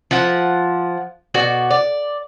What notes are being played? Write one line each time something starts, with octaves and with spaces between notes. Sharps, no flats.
F3 F#5
B2 F#4 D5
D5